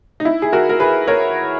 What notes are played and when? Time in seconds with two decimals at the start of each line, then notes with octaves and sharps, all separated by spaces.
0.20 D#4
0.25 E4
0.42 G#4
0.53 F#4 A#4
0.69 A#4
0.80 G#4 B4
1.08 A#4 C#5